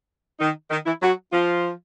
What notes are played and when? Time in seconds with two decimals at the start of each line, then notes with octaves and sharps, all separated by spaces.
0.40 D#3 D#4
0.71 D#3 D#4
0.86 E3 E4
1.02 F#3 F#4
1.32 F3 F4